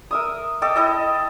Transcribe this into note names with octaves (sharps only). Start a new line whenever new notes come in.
A#4 E5 D#6
A4 D#5 G5 D6
E4 A4 D#5